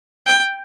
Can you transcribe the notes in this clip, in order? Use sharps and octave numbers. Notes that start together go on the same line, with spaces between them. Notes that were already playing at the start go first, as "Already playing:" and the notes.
G5